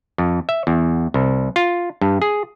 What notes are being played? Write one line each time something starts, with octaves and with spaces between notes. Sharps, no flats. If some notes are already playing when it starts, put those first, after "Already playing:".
F2
E5
E2
C2
F4
G2
G#4